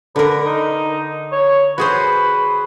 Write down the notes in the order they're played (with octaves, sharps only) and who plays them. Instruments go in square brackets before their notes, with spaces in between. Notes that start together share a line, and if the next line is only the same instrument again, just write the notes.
[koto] D3 A#4 [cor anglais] B4
[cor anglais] D#4
C#5
[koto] F#4 G#4 C5 [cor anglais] B4